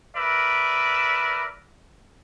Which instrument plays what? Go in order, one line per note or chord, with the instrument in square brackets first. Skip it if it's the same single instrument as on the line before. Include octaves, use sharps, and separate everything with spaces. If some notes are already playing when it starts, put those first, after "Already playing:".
[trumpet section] A#4 B4 D5 E5